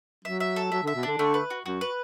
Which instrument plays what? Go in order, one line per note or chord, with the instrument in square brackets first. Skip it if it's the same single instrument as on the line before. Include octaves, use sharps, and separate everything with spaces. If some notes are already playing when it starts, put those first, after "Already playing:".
[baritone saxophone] F#3 [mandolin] E5
[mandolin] E5
A4
[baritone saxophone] F#3 [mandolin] E5
[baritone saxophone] D3 [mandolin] E5
[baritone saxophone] B2
[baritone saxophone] D3 [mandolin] D4
[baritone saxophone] D3 [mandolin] A3
[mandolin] B4
F#4
[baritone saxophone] F#2 [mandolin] F#4
[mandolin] B4